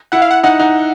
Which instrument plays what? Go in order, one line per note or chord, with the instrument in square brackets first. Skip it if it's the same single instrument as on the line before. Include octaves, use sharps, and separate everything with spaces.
[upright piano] E4 [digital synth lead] F#5
[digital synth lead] F5
F#5
[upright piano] D#4 [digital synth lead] F#5
[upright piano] D#4